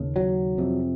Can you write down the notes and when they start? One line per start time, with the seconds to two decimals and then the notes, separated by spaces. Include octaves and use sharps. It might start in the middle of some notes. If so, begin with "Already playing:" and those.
Already playing: D#2 C#3
0.16 F#3
0.58 F2 C3